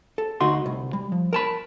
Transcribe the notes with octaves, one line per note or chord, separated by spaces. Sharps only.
A4
D2 D#4 F#4 C6
C2
G3
F3
A#4 A5 B5